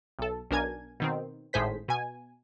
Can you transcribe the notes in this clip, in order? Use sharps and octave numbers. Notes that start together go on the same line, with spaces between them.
B1 A4
B1 D4 A#4 G#5 G#6
B2 D#3 C4
G#1 A2 G#4 C5 B6
B2 G#5